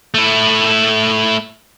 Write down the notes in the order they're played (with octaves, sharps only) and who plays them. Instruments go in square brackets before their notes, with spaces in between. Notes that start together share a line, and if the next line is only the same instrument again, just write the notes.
[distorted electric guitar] A3 E4